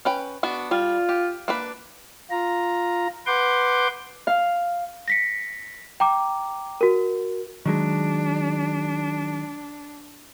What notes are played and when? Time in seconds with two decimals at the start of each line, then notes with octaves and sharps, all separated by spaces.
0.05 C#4 B4 G5
0.43 B3 D4 F#4
0.71 G3 F4
1.09 G4
1.48 A#3 D4 B4
2.30 F4 A#5
3.26 B4 F#5 C6 D6 G6
4.27 F5
5.08 A#6 B6 C#7
6.00 G5 A#5 D6
6.81 F#4 A#4
7.66 D#3 F#3 G#3 D4